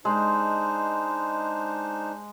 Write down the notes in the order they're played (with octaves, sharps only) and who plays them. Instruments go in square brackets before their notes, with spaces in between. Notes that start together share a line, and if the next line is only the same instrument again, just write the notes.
[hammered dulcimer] G#3 [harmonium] D4 D#4 C5